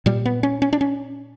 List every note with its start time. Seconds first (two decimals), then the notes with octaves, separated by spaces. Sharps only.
0.06 A#2 G3
0.26 B3
0.43 C#4
0.62 C#4
0.73 D4
0.81 C#4